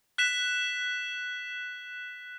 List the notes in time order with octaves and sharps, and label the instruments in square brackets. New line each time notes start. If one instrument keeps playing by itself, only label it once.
[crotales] F#6 B6 E7